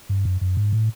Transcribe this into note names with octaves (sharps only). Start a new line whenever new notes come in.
G2
F#2
F#2
G#2
A2